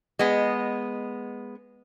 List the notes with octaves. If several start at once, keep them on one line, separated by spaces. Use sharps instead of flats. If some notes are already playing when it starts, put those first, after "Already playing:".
G#3 B3